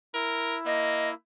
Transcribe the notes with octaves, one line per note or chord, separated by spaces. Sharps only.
E4 A#4
A#3 D#5